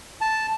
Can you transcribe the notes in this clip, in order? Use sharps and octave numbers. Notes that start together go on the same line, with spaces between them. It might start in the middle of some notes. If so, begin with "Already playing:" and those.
A5